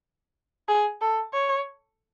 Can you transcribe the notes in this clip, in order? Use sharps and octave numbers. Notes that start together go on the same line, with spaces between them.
G#4
A4
C#5